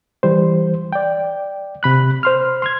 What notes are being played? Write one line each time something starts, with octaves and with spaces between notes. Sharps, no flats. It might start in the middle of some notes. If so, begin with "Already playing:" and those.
E3 G3 C5
D5 G5
C3 B5 F#6
C5 C6 F6
C6 F6 G#6